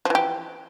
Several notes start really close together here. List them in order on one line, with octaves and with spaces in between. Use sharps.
F3 E3 G4